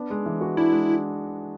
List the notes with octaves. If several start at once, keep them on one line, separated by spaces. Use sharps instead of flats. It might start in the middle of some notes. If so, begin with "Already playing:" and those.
Already playing: B3 D4
G#3
E3
F#4
D4 E4
G#3